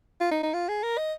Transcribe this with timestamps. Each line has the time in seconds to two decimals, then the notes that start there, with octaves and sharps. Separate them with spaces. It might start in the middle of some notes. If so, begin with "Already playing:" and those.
0.20 F4
0.31 D#4
0.43 D#4
0.54 F4
0.68 G#4
0.83 A#4
0.98 D#5